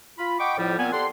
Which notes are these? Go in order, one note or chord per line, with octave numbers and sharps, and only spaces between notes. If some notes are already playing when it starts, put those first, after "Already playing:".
F4 B5
D#5 F#5 G5 B5 C#6 D6
F2 A2 F3 G3
A#2 B3 C4 G#5
G4 A4 D5 F#5 C6